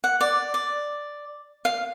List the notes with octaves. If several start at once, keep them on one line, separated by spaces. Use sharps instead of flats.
F#5
D5
D5
F5